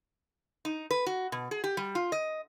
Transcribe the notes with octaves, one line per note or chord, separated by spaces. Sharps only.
D#4
B4
F#4
B2
G#4
G4
G3
F4
D#5